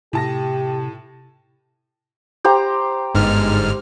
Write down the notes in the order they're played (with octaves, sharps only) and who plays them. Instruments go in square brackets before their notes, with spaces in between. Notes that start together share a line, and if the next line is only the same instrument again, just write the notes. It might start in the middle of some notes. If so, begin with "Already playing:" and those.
[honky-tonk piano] A2 A5 A#6 [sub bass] C3 [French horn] G4
[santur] G4 C5 A#5
[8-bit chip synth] G1 G#2 F6